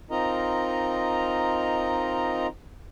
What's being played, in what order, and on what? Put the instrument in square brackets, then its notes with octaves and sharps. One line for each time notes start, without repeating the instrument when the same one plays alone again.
[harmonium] C4 D#4 F4 A#4 D#5 A#5